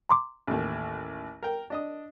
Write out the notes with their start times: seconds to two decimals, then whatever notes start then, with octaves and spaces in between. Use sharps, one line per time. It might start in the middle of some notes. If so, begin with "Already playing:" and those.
0.09 A#5 C6 D6
0.47 A1 D#2
1.43 A#4 G5
1.70 D4 D#5 D#6